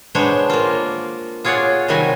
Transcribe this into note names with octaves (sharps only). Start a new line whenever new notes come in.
G#3 B3 D4 C5 C#5
A#3 F4
F4 G#4 C#5 D5 F#5
C3 D#3 F#3 G3 F#4 G#5